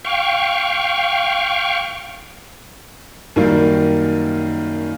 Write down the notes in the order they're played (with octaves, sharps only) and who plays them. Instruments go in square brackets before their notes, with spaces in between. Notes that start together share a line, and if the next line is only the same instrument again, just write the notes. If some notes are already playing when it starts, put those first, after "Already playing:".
[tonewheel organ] F5 G5 C#6
[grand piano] F#2 D#3 G3 A#3